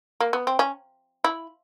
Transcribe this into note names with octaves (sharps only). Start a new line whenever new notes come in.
A#3
B3
C4
C#4
E4